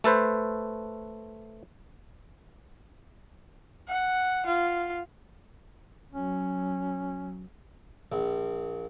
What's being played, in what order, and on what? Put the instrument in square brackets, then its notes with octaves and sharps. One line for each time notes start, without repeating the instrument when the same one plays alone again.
[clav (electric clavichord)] A3 A4 B4 C5
[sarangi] F#5
F4
[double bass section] F#3 [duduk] C#4
[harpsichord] A#1